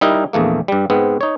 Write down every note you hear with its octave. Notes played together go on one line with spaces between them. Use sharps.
G3 D#4 E4 A#4
A#1 E2 A3 A#3
G2 G3
G#2 B3 C4
D#4 C#5